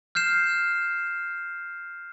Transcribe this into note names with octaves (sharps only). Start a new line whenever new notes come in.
F6 G6 C7 E7